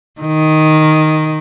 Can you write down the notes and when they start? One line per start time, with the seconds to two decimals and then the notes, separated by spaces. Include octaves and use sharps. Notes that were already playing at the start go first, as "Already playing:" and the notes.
0.21 D#3